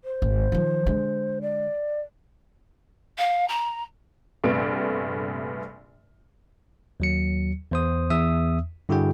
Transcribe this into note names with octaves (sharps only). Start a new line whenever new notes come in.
C5
G#1
D#3 F3
D3 G#3
D5
F5
A#5
A#1 G2 C3 A3 B3 D7
D#2 F#3 C#7
E2 C5 D#6
E2 E5 D#6 E6
G2 D3 E4 F#4 G#4 G5